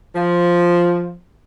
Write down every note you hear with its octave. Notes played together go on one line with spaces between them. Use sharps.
F3